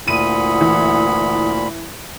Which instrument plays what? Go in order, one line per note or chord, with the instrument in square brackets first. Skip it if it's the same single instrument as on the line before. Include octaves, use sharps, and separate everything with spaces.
[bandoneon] D2 A#2 B5 [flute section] E4 F#5 D#6 [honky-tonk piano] D#7
[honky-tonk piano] E3